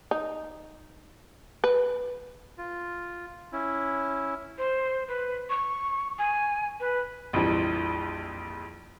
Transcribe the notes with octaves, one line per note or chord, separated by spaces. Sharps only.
D#4
B4
F4
C#4 E4
C5
B4
C#6
G#5
B4
A#1 F2 E3 G3